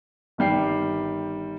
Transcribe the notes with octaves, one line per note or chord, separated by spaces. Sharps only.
G1 D#3 G3 G5 C7